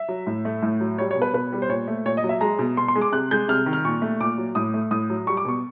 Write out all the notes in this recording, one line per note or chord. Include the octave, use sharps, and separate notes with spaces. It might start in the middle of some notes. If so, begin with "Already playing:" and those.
Already playing: E5
F#3
A2
A3
A2
F#3
G3 C#5
C#5
B2
B4
B2 B4
G3
C5
A#2 C#5
A3
A#2 C#5
D#5
F#3
E5
G#3 A#5
B2
B2 C6
C6
G#3
D6
C3 F#6
G#3 G6
C3 F6
D#3
F6
A#2 C#6
A3
A#2 D6
F#3
A2 D#6
A3
A2 D#6
F#3
G3 C#6
D6
B2 C#6